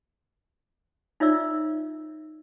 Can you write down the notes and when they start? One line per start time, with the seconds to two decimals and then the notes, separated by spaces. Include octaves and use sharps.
1.20 D#4 F4 C#5 D5 E5 E6